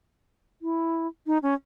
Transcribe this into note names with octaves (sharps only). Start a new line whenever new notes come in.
E4
D#4
C#4